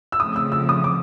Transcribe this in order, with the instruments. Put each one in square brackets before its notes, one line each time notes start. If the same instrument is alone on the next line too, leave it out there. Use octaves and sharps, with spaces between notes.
[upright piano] E6
[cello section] C#3 F3 A3 C4 [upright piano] D#6
[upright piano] E6
E6
D#6
D6